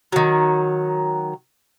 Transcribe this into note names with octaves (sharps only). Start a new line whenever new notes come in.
D#3 F#3